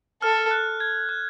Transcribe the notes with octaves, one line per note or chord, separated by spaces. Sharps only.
A4 F6
F#6
G#6
F#6